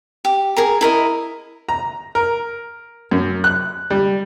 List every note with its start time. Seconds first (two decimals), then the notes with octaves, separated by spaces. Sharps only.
0.25 G4
0.57 G#4 A#4 A#5
0.81 E4 A#4 D#5
1.69 A#5
2.15 A#4
3.11 F#2
3.44 F#6
3.90 G3